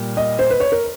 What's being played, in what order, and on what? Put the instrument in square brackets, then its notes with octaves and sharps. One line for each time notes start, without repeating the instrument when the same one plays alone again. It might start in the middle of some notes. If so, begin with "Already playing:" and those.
Already playing: [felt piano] A#2 G3
D#5
C5
B4
C#5
A#4